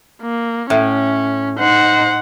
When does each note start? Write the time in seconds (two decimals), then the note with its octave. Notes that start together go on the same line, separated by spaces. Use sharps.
0.22 A#3
0.70 A2 C#4
1.60 D#4 C5 F#5